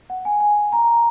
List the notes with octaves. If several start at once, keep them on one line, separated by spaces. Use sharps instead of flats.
F#5
G#5
G#5
A#5